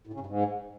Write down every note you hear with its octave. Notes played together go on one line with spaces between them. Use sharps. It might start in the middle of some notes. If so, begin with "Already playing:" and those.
A2
C#3
G2
G#2